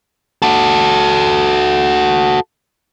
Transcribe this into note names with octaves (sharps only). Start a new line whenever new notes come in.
F#4 A4